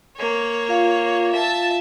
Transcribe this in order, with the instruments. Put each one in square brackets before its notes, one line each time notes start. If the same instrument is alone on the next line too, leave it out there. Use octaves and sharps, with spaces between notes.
[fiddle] A#3 C#5
[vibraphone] F4 F5
[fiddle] E5 A5